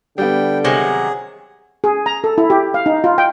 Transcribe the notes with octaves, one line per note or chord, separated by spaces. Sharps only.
D3 G3 B3 G5
C3 D#3 F#3 G#4
G#4
A#5
A4
E4
G4
F5
D#4
F4
G5